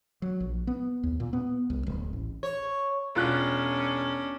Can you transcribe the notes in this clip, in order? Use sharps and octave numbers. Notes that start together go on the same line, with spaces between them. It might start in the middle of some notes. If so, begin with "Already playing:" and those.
F#3
A#1
B3
D#2
A#2
B3
C2
D1
A1
C#5
E1 C#4 D4 F4 F#6